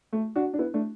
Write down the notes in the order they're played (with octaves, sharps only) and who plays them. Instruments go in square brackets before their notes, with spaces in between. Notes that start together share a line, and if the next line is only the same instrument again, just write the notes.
[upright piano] A3
D4 F#4
D4
B3 E4
A3 D4